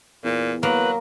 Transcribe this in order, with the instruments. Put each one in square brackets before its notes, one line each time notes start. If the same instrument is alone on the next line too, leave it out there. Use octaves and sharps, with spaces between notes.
[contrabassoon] E2 [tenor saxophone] A#2
[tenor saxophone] F#3 [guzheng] A#3 [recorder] B4